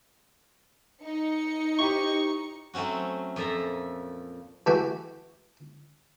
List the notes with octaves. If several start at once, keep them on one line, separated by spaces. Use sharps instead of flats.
D#4 C#7
E4 G4 C5 C#6
F#3 A3 C4 C#4 F#4
F2 A#2 A4 E5 A#5
E3 A3 E4 F#4 G4